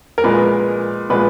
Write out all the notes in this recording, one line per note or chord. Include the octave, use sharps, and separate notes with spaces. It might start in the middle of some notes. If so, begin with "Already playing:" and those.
A#4
A#2 F3 G#3 B3 B4
A#2 F3 G#3 B3 B4